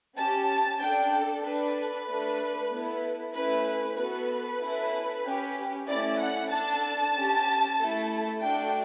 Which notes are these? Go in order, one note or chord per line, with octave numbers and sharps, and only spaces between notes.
C#4 G4 A5
D4 A4 G5
A4
D4 A4 B4
A3 D4 A4
B3 E4 A4
A3 C#4 E4 B4
B3 F#4 A4 B4
C#4 E4 A4
C#4 G4
A3 C#4 E4 D5
F#5
D4 A4 A5
C#4 G4
A3 E4 A4
A3 D4 F#4 A4 G5